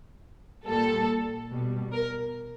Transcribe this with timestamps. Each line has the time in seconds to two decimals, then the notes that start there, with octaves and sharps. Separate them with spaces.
0.67 A#2 G3 A4
1.50 B2 G3
1.92 A#4